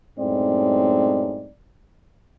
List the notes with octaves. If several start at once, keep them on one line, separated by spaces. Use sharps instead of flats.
F#2 A2 G#3 C4 D#4 D5